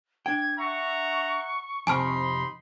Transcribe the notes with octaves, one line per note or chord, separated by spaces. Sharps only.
D4 G5 G#6
E5 F#5 A#5 C#6
F2 C3 D#4 G#5 A5 B5 C6 F6